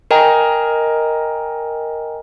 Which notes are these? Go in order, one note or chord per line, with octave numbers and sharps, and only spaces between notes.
A#4 D#5 G5 G#5 A#5